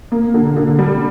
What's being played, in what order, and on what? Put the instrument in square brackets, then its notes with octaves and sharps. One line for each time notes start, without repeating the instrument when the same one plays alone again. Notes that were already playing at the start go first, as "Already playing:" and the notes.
[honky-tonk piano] A#3
D3
D3
G3